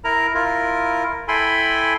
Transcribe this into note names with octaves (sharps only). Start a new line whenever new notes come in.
E4 A#4 A#5
E4 F4 A#4
E4 A4 G5 G#5 B5 C6